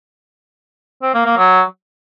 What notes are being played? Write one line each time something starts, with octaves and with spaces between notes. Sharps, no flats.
C4
A#3
A#3
F#3